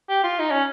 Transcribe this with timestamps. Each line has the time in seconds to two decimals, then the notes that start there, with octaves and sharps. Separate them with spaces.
0.09 G4
0.23 F4
0.39 D#4
0.51 C#4